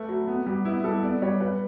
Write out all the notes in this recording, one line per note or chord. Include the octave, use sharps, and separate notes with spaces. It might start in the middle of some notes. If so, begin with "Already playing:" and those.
Already playing: A3 B4
F#3
B3
G3
B3 E4
G3 A4
B3 D5
G3 C#5
G3 B4